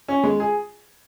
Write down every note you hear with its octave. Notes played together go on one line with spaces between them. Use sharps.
C#4
G#3
G#4